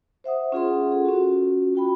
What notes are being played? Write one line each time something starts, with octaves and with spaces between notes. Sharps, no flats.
C5 E5 F#5 D#6
C#4 F4 G#4 F#5 C6
G#4 A4
C#4 F4 F#4
F#4 G5 B5